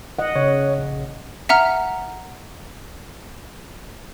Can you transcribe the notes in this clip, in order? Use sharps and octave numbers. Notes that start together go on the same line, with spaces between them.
D#5 F#5
C#3 C#5
A#1
E5 F#5 A#5 F6